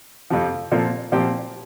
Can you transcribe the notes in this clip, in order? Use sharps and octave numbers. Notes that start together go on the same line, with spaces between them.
F2 C3 F3
A#2 F3 C4 F4 A4
A#2 F3 C4 G4